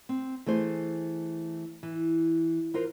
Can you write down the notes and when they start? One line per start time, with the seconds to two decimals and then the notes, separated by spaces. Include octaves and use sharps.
0.09 C4
0.46 E3 A3 G#4 C5
1.83 E3
2.74 E3 F4 A#4 C5